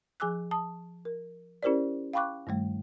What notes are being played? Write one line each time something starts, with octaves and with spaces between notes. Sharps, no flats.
F3 G#4 G#5 D6 E6 F#6
A5 D#6
A#4
C#4 E4 G4 A#4 C5 D5
F5 G5 B5 C#6 D6 F#6
G2 D#3 G3 A3